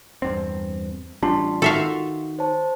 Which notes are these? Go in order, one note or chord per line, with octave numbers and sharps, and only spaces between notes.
E2 G2 C4
A1 G3 D4 F4 C6
D#3 F#4 A4 E5 F5
C5 C#5 A5